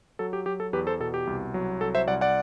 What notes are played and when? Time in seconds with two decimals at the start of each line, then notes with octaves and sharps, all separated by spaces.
0.19 F#3 A4
0.33 G4
0.46 F#3 G4
0.60 A4
0.73 E2 G4 B4
0.87 A4 C5
1.00 B2 A4
1.14 G4
1.27 C2
1.54 F#3
1.81 C2 A4
1.95 C5 E5
2.08 C2 D5 F#5
2.21 D5 F#5